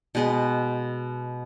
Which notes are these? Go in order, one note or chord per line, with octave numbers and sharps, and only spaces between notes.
B2 G#3 B3